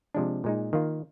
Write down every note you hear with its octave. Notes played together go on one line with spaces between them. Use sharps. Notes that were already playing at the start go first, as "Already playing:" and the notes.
C3 F3 G#3 D4
A#2 G#3 D#4
D#3 A#3 F4